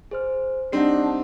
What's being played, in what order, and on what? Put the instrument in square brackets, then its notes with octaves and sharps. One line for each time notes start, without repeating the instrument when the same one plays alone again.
[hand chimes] G#4 C5 F6
[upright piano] G3 C4 D#4 [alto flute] D4 [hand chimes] F#5 C7